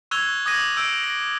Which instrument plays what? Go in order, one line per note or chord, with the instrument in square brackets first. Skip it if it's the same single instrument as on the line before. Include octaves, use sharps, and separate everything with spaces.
[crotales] C#6 E6 F#6 G#6 F7 G7
D6 D#6 G#6 A#6 D#7
E6 G6 D7
A#6